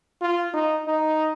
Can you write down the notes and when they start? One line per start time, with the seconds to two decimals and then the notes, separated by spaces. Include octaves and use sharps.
0.21 F4
0.54 D#4
0.87 D#4